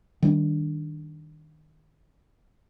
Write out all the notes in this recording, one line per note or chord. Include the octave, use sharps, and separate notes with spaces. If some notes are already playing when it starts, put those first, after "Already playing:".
D#3 G3 D4